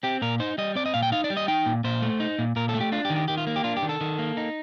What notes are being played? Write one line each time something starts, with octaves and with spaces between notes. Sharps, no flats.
C4 G4
A#2 A#4
D#4 C5
G3 D#5
C4 D5
D#5
A#2 F5
G5
D#4 F5
D5
G3
D#5
D#4 G5
A#2
A#2 C5
A3
D#4
A#2
A#2 A#4
A4
A3
G4
D4 F4
G4
D#3
G4
D#3 G4
F4
A#3
G4
D4 F4
G4
D#3
A4
D#3
A#3
D#4